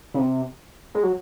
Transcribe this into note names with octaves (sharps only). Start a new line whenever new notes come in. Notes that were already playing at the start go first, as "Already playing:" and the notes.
C#3
C3
G#3
F#3